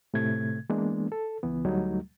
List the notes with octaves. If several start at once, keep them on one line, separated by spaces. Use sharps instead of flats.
A2 C3 A3 G#6
E3 G#3 A#3 B3 D4
A4
C#2 E3 B3
D2 F#3 G3 A3 D#4